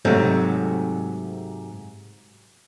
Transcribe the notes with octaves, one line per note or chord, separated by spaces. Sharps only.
G#2 C3 F#3 A3